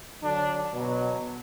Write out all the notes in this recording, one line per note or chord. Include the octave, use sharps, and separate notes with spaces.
D3 F#3 D4
B2 F#3